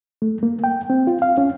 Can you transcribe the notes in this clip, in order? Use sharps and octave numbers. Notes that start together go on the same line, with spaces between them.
A3
A#3
G5
C4
F4
F5
C#4